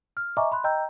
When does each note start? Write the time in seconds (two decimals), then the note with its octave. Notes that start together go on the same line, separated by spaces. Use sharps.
0.17 F6
0.37 D#5 E5 G#5 A#5 C#6 D6
0.52 B5 C6 F#6
0.64 D#5 G5 A#5 E6 G6